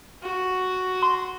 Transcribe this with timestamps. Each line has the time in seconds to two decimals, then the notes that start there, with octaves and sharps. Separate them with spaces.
0.23 F#4
1.03 C6